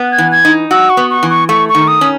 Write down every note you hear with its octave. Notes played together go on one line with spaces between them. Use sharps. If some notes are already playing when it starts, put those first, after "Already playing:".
Already playing: B3
G#6
E3
G#6
D#4
F#4 E6
C#6
B3
C#6
E3
C#6
A3 C#6
C#6
D#3
D#6
C#4